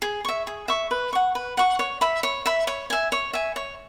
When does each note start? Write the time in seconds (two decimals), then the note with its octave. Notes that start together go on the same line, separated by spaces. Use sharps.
0.02 G#4
0.25 E5 C#6
0.47 G#4
0.68 E5 C#6
0.91 B4
1.13 F#5 C#6
1.35 B4
1.57 F#5 C#6
1.79 C#5
2.01 E5 B5
2.23 C#5
2.46 E5 B5
2.67 C#5
2.90 E5 G#5
3.12 C#5
3.33 E5 G#5
3.56 C#5